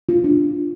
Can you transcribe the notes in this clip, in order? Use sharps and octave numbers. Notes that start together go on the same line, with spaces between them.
F4
D4